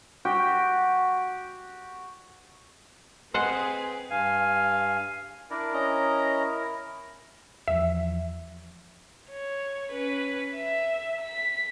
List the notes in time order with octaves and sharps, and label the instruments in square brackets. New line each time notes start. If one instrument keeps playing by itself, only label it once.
[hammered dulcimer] F#4 G4 G5
[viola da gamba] C4 G#4 B4 [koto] C5 D#5 F#5 [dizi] G#5
[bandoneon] G2 F5 G#5
[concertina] D4 D5 [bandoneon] E4 A#4
[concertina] C#4 D#5 A#5
[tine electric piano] E2 E3 F3 [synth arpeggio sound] E5
[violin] C#5
C#4 B4
E5
B6